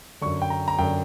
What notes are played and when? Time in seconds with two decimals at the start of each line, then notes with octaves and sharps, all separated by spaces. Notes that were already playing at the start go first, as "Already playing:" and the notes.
0.21 F#2 D3 C#6
0.42 G5
0.50 A#5
0.68 A#5
0.79 F#2 D3 G5